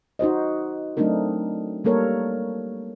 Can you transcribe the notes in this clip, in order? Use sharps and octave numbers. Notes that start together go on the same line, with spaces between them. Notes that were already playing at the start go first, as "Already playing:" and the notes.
D#4 F#4 C5 D#5
F#3 A3 C4 D4 D#4 A#4
G3 A#3 A4 A#4 C#5